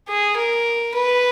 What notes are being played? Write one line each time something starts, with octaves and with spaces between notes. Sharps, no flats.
G#4
A#4
B4